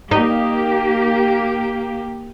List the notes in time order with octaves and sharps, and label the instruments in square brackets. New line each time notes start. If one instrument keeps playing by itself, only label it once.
[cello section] A#3 G4 [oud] D#4